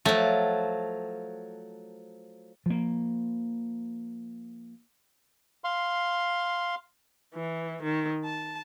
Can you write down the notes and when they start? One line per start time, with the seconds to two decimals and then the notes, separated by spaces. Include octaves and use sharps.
0.05 F3 F#3 A3
2.66 F3 A#3
5.64 F5 C6
7.35 E3
7.83 D#3
8.25 A5